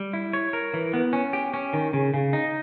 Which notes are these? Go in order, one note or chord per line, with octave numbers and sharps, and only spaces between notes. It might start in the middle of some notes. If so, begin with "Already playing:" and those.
Already playing: G3
E4
C#5
A#4
E3
B3
C#4
G4
C#4
D#3
C#3
C#3
D#4